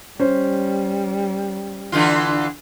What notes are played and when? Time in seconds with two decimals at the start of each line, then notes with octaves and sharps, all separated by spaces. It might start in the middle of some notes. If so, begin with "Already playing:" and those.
0.20 G3 C#4 C5
1.92 D3 E3 F4